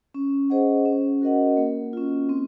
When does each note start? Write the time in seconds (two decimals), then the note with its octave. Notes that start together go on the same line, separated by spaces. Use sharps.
0.14 C#4
0.50 G#4 C5 D#5 F#5
0.85 C#4
1.21 F#4 A#4 D#5 F#5
1.57 A#3
1.93 C#4 F4
2.29 C4